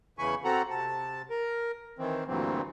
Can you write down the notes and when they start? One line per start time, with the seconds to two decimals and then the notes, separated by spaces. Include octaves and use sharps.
0.19 E2 C#3 E3 G#5 B5 C#6
0.44 C4 F#4 A4 F#5 A#5
0.70 C3 A5
1.30 A#4
1.99 D#3 E3 C4
2.27 D2 G2 A#2 E3 F#3 C4